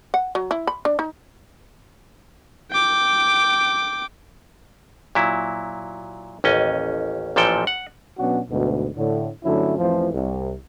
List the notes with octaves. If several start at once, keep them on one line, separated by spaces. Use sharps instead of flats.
F#5
F#3
E4
B5
D4
D#4
G5 D6
A#2 F#3 E4
A1 D#2 C#4 D#5
A1 A#2 F3 A4 G5
F#5
B2 F#3 B3 C#4 D4 F#4
D2 G#2 B2
A2 D3
G2 D3 F#3 A3 C#4 E4
A1 F2 A2 E3 F3
C2